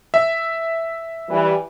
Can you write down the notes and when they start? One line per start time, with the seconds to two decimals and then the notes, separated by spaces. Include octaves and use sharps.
0.14 E5
1.29 E3 G3